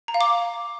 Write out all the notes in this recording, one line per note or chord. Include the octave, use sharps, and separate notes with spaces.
A#5
F5
D6